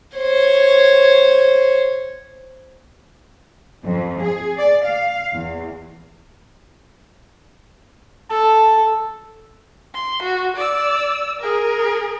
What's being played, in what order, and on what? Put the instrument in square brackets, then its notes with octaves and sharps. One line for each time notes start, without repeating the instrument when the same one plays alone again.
[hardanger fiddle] C5 C#5
[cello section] F2
G#4
D5
F5
E2
[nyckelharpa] A4 [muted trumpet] A5
[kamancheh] C6
F#4
D5 E6
G#4 A#4